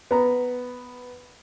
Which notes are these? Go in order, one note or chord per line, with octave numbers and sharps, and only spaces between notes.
B3 A#5